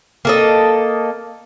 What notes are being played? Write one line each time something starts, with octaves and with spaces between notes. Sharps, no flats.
A#3 A4 D#5